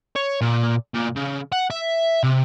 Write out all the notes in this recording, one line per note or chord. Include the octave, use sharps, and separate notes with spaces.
C#5
A#2
A#2
C#3
F#5
E5
C3